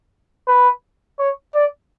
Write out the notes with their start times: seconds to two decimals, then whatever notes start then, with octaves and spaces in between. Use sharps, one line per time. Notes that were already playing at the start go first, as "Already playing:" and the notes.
0.47 B4
1.19 C#5
1.55 D5